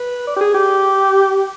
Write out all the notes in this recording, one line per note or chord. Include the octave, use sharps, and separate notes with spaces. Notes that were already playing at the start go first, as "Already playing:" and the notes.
Already playing: B4
D5
G4
G#4
G4